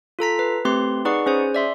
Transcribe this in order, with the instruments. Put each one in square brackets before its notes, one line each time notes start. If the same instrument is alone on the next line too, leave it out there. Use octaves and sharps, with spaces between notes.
[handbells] F4 A4 A#5 B6
B4
A3 C4 G4 B4 C6
D#4 G#4 B4 D5 F#5 C#6
C#4 G#4 C5 G#5
D5 E5 C6